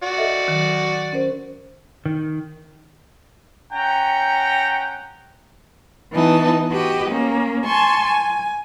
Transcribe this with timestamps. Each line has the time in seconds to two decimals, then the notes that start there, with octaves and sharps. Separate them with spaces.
0.03 F#4 D5
0.18 A4 D#5 E5
0.48 D#3 F#3
1.13 C#4 A#4 C5
2.06 D#3
3.73 C#4 F#5 G5 A#5
6.13 E3 B3 D#4 A5
6.71 F#4 G4 B4 D#5
7.09 A#3 C#4
7.64 G#5 A5 C6 C#6
8.05 G#5